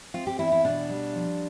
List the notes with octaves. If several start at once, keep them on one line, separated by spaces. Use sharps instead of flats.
C4 F4
G4
E2 E4
E4
B2 D4
G3
F3